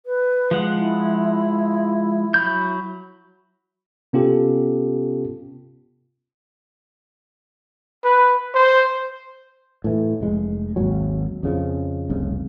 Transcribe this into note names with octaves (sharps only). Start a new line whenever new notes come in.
B4
F3 G#3 F#5
E4
F#3 B5 G6
C3 B3 C#4 F4 G4 A4
B4
C5
A2 E3
F1 G#3
G#1 D#2 F#3
F2 C#3 F3
F1 C2 F2 C#3